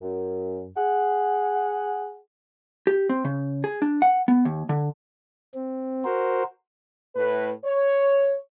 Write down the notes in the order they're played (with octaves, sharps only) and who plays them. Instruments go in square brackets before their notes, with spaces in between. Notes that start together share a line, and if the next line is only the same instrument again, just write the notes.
[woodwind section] F#2
G#4 F#5
[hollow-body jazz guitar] G4
C4
C#3
G#4
D4
F#5
B3
D#2
D3
[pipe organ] C4
F#4 A#4 C5
[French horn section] A2 B4
C#5